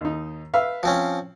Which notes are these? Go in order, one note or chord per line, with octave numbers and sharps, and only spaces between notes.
D#2 D#4
B4 E5 F5
F3 C4 C#4